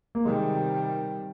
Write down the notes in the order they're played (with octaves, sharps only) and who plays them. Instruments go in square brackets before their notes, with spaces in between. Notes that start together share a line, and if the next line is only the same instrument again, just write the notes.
[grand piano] A#3
[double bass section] C3 D#3 G3 [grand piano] G#3